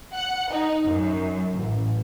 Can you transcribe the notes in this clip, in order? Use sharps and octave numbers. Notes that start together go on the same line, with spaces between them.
F#5
D#4
F#2
A1